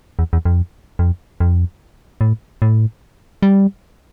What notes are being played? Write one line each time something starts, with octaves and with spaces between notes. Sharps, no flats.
E2
E2
F2
F2
F2
A2
A2
G3